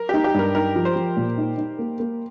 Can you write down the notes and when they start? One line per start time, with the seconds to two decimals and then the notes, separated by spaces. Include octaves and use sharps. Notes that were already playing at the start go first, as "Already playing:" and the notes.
Already playing: A#4
0.09 D#4 G4
0.24 G4
0.34 G2 A#4
0.55 D#4 A#4
0.76 F3
0.85 C5
0.96 F3
1.17 A#2
1.38 D#4
1.58 D#4
1.79 A#3
2.00 A#3